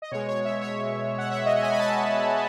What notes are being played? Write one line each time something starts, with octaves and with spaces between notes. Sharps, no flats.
D#5
B2 G#3 C#5
C#5
E5
C#5
F#5
E5
D#5
F#5
G#5
B5
A5